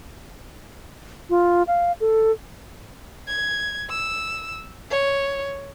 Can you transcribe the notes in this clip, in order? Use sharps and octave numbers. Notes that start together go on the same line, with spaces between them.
F4
F5
A4
G#6
E6
C#5